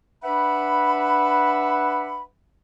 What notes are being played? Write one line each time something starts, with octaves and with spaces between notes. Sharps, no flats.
D4 B4 E5 F#5 B5